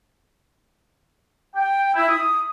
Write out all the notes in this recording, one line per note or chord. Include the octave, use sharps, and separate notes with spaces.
G5
E4
D#6